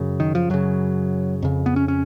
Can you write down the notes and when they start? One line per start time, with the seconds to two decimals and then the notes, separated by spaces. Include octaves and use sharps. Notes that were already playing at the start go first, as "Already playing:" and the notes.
Already playing: F#2 C#3
0.20 D#3
0.35 F3
0.50 F#2 C#3 F#3
1.42 F2 C#3
1.66 B3
1.76 C#4
1.88 C#4